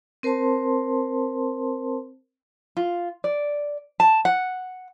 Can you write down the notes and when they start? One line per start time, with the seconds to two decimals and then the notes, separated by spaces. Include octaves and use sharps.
0.23 C4 A#4 C5 A5 C6
2.77 F4
3.24 D5
4.00 A5
4.25 F#5